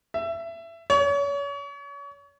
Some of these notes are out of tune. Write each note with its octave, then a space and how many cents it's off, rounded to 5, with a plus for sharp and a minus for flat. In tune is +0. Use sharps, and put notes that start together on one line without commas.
E5 +20
C#5 +35